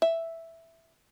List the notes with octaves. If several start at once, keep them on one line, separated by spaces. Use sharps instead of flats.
E5